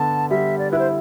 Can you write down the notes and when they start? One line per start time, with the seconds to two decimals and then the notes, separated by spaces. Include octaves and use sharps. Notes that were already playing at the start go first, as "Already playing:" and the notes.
Already playing: D3 B3 A5
0.30 G3 E5
0.59 D5
0.71 E4 B4
0.79 C5